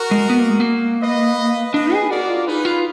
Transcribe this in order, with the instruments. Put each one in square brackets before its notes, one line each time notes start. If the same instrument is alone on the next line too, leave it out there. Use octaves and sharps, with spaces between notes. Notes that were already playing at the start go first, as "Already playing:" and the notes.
Already playing: [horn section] F#4 A#4
[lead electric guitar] G#3
B3
A#3
G#3
A#3
[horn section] B4 D#5
[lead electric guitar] D4 [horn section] B4 D#5
[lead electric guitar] G#4
[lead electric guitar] F#4 [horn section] A#4 D5
[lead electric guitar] F4
[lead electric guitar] D#4 [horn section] G#4 B4
[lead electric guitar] F4